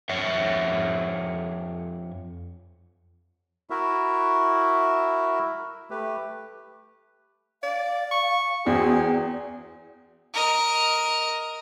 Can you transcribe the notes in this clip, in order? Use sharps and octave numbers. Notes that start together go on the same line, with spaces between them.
F2 C#5 E5
E4 F#4 A#4 E5
A3 G4 B4
D5 F5
C#6
E2 C4 F#4 G#4
A#4 D#5